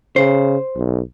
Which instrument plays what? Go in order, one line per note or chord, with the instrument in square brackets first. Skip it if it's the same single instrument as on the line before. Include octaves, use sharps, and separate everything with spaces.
[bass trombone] C#3 [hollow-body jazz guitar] C5
[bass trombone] B1